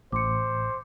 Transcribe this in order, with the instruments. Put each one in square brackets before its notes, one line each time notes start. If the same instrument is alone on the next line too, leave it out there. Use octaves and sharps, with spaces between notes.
[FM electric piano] A1 [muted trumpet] C5 [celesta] D6 C#7